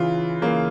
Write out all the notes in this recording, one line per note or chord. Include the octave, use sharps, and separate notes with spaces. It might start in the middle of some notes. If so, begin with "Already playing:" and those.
Already playing: C#3 E3 F4
C#3 E3 A#3